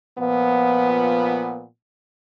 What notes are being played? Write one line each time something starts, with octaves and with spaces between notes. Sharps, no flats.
A#2 F3 B3